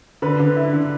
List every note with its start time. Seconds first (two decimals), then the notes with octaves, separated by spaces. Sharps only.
0.22 D3 B4
0.40 D3
0.56 E4
0.73 D3